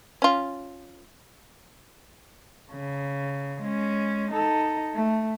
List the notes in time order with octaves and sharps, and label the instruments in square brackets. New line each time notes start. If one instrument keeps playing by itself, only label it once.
[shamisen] C#4 F4
[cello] C#3
G#3 C#4
D#4 A4
A3